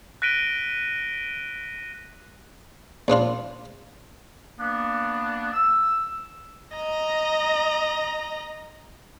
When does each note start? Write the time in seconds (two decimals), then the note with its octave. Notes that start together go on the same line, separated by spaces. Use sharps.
0.22 F#6 A#6 B6 D7 D#7 G7
3.08 A#1 F3 D4 F4
4.59 A#3 B3 D4
5.53 E6
6.75 D#5 A#5